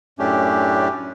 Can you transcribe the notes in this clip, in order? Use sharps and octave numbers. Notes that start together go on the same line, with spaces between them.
F#2 A2 A3 C#4 D4 G4